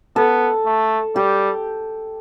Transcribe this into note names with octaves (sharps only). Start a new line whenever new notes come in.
B3 A4
A3
G3 G4